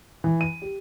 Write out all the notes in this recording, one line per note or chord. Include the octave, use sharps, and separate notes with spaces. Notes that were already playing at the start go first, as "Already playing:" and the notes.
E3
D#7
G4